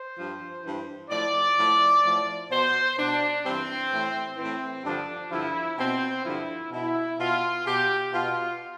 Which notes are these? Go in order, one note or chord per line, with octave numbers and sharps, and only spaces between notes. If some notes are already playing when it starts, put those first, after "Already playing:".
Already playing: C5
G2 F3
G2 E3
A2 F3 D5
A2 F3
A2 F3
B2 C5
B2 D4
G2 E3 C4
A2 E3
A2 E3 C4
G2 D3 F3 D4
G2 D3 F3 E4
B2 C4
G2 D3 F3 E4
B2 E4
B2 F4
B2 G4
B2 F4